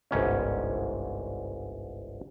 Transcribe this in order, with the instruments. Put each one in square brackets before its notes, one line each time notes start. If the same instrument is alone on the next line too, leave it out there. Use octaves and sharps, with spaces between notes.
[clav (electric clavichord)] G1 C2 G#2 C#4